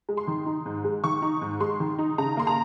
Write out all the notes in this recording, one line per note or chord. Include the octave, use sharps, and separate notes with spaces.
G#3
C6
D#3
D#4
G#2
G#3
D#3 C#6
D#4
G#2
G#3 C6
D#3
D#4
C#3 A#5
A#3 C6
A#5